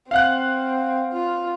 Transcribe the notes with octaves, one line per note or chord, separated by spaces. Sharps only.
C4 F5 F#5 F#6
F4